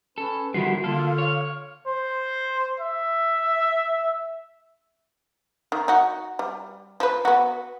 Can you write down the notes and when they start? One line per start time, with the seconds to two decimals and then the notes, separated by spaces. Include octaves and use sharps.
0.18 C#4 A4 B4
0.54 D3 D#3 F3 G3 B3 E4 F#4 C6
0.84 D3 A#3 F4 A4 F5
1.18 C#5
1.87 C5
2.80 E5
5.72 D#3
5.88 D#4 F#4
6.39 G3
7.00 F3 B4
7.25 B3 F#4